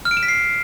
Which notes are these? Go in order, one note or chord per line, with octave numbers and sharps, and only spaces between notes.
F6
D7
E7
B6
C7